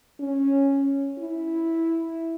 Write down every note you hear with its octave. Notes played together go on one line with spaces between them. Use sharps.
C#4
E4